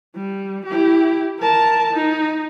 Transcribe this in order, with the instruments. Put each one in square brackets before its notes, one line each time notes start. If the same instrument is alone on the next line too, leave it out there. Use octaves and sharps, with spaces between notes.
[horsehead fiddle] G3
E4 G4
A#4 A5
D#4